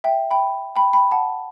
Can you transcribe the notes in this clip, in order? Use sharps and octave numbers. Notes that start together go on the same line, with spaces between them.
E5 G5
G5 B5
G5 B5
G5 B5
F#5 A5